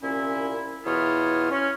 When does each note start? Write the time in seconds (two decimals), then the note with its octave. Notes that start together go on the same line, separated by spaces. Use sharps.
0.02 C2 A#2 C#4 E4
0.85 E2 B2 E4 F4 C#5 D#6
1.51 C#4